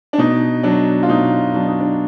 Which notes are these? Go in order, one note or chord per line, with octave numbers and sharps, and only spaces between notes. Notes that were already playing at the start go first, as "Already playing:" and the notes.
D4
B2 D#4
F#3 D4
F4
B2 D#4
F#3 D4
D#4
D4